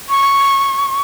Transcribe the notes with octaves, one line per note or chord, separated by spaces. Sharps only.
C#6